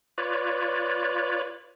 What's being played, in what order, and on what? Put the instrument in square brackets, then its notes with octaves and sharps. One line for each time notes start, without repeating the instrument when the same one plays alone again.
[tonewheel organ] F4 B4 C#5 D5